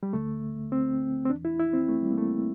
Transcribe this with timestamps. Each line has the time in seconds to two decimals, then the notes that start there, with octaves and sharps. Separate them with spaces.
0.03 G3
0.13 D2 D3 A3
0.72 C4
1.25 C4
1.30 E2 E3 D4
1.45 E4
1.59 E4
1.74 C4
1.88 A3
2.02 G3
2.11 A#3
2.17 A3